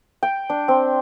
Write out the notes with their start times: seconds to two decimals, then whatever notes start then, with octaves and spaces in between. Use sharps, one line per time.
0.23 G5
0.50 D4
0.68 C4